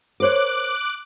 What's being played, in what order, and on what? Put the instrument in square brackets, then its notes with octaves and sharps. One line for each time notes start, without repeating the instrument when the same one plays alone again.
[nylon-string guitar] A#4 C5 C#5 [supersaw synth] D6 F#6